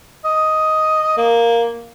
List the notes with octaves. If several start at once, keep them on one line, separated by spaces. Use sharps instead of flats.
D#5
A#3